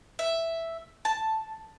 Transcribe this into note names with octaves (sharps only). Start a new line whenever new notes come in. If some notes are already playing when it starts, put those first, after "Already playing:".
E5
A5